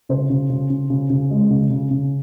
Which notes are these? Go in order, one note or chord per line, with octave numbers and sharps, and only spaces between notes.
C#3 C5
C#3
C#3
C#3
C#3
C#3
G#3
C#3
C#3
C#3